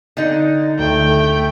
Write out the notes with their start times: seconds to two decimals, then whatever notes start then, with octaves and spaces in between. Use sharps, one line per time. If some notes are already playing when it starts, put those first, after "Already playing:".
0.17 D3 D#4
0.79 D2 A3 G5